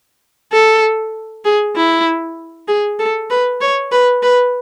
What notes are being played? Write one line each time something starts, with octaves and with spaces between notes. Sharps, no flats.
A4
G#4
E4
G#4
A4
B4
C#5
B4
B4